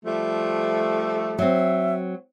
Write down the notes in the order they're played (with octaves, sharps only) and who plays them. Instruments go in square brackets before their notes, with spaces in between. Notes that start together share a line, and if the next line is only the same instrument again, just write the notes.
[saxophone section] F3 G3 A3
[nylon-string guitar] F#3 C4 [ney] E5